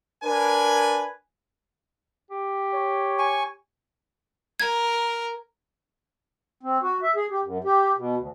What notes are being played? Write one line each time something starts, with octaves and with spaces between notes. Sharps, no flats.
D4 A#4 B4 G#5
G4
C#5
G#5 C#6
A#4 G#6
C4
F#4
E5
G#4
G4
F#2
G4
B2
D2